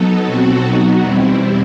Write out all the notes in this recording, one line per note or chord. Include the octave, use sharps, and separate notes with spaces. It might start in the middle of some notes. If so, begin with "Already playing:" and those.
Already playing: F#3 B3 D#4 A4
B2 F#3 C4 F#4 A4
F#3 B3 D#4 F#4
E2 B2 G3 C4 E4